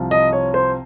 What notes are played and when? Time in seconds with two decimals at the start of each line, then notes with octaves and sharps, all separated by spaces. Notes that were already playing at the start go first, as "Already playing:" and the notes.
Already playing: C2 C3 F3
0.11 D#5
0.33 C#5
0.54 C5